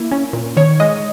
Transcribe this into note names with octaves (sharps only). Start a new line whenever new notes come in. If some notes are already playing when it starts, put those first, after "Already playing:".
Already playing: A#3 E4
C#4
A#2
D#3 C#5
G#3 D#5